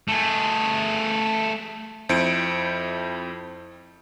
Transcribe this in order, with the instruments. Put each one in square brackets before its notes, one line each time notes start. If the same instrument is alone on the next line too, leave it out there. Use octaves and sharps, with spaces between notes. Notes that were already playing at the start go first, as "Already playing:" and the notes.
[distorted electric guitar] A3 G#4
[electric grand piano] F2 E4 C5 G6 C#7 D7